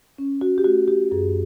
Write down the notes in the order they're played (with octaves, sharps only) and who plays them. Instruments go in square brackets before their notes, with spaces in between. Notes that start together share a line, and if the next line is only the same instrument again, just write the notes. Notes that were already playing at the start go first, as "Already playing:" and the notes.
[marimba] C#4
F#4
G4
A3 F#4
G4
F#2 G#4